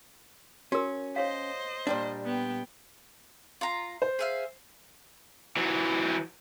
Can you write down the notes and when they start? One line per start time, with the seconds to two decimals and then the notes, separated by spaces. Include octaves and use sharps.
0.72 C#4 F#4 A#4
1.16 C5 C#5 D#5 F5
1.87 A#2 G3 D4
2.25 B3 G5
3.61 F4 A#5
4.02 C5
4.19 G#4 E5 F5
5.57 E3 F#3